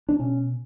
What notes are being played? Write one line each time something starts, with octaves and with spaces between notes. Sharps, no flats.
D4
B2 C#4